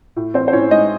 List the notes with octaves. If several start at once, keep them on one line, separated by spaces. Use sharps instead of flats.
A2
E3 C4 C5
C5
A2 C#4 C#5
G#3 D#4 D#5